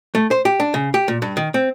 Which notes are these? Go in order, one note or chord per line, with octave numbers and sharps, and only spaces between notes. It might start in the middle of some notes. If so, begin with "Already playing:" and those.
A3
C5
G4
D4
C#3
G4
A#2
G2
D#3
C4